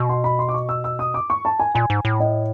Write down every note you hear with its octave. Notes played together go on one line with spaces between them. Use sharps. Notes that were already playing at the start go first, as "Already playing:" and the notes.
Already playing: B2
C6
B5
C6
D6
C#6
E6
E6
D#6
D6
C#6
A5
G#5
A#2 G#5
G#2
A2
D#5